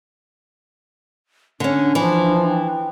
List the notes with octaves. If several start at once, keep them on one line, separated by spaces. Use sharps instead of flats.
D3 C#4 D4
E3 F3
G5